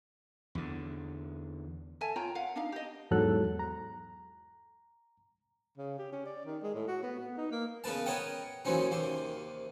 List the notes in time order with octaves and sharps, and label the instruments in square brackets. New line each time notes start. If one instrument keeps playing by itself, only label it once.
[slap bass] E2 D3
[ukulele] A4 E5 G#5 A5
F4 C#5 G5 A#5
F5 F#5
D4 D#4 F5
G4 D#5
[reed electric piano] E2 G#2 F#3 A4 F#6
A#5
[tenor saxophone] C#3
G4
C#4
D5
D#3
G#3
A2
F#4
B3
B3
D#4
A#3
[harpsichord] C#3 B3 A#4 B4 A5
A#4 B4 C#5 D#5 F#5 G5
D#2 E3 F#3 C4 C#4 D#4
D#2 C3 C5